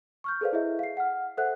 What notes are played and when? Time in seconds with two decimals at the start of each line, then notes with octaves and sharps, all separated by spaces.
0.24 C#6 F6 G6
0.41 G#4 A4 B4 C5 D5 F5
0.52 E4 G#4 D#5 E5
0.79 F5 C7
0.97 F#5 F6
1.37 A4 C5 E5 F#5 F#6